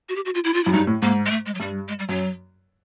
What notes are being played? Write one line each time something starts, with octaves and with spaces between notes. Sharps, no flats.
F#4
G4
F#4
F4
E4
F4
F#2 E4
G2 D#4
A2
G#2 A#3
G#3
A3
G#3
F#3
G2 G3
G#3
G3
F#2 F#3